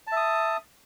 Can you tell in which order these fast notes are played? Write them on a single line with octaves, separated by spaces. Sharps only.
A5 E5 D#6